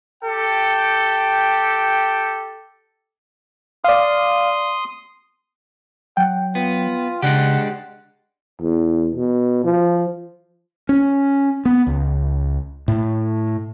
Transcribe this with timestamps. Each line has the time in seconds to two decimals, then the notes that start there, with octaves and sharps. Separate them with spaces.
0.24 G4 A4 G5
3.84 D5 F5 C6 D#6
6.17 F#3 F#5 G5
6.55 B3 F4
7.22 C#3 G#3 D4 G4 F#5
8.61 E2
9.15 B2
9.64 F3
10.89 C#4
11.65 B3
11.87 C#2
12.88 A2